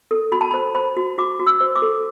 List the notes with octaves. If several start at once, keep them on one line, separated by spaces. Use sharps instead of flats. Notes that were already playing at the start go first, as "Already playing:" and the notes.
A4
F#4 B5
A5
C5 B5
C5 B5
F#4
F#4 D6
F#4
E6
C5
D6
A4